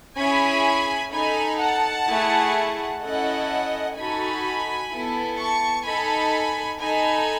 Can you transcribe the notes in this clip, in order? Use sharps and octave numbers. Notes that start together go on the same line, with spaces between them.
C#4 E4 G#4 G#5 B5
D#4 A4 G#5 B5
F#5 A5
A3 E4 G#4
C#4 E4 A4 D#5 F#5
D#4 F#4 A4 G#5 B5
B3 E4 A4
A5 C#6
D#4 A4 G#5 B5
D#4 A4 G#5 B5